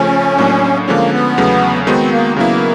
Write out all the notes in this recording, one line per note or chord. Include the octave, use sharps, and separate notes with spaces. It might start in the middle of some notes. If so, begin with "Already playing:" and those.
Already playing: C#3 F3 A3 C#4
A2 F#3 A#3 D4
D3 F3 G#3 A#3 C#4
B3
E2 C#3 F#3 A3
D#3 G#3 B3 C4 D#4 F#4
A#3
C#3 F#3 A#3 B3 E4